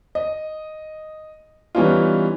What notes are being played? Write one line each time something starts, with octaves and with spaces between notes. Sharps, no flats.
D#5
E3 G3 B3 C#4 D#4 F4